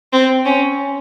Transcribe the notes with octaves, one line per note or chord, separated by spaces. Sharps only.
C4
C#4